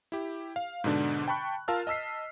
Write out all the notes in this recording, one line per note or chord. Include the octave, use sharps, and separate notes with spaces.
E4 G4
F5
G#2 B2 D3 D4
G5 A5 B5 C#6 F#6
F4 A#4 F5 A5 E6 F6
D#5 A5 E6 B6 C7